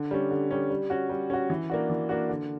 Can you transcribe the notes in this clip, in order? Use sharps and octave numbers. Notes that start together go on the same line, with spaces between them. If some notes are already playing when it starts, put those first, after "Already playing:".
Already playing: D3
G3 C#4
D3
G3 C#4
G3
C#4 F#4
G3
C#4 F#4
E3
A#3 D4 F#4
E3
A#3 D4 F#4
D3